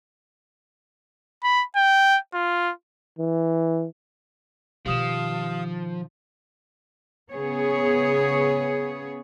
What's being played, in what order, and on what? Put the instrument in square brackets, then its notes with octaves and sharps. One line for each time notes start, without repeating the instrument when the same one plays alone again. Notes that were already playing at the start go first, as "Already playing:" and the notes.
[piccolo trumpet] B5
G5
F4
[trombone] E3
[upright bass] B2 D#3 [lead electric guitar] F3 [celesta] G4 D#6 E7 [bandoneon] F5
[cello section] C#3 B3 G#4 C#5